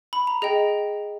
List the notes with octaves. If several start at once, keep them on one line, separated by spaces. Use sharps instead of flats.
B5
A#5
G#4 D#5 G5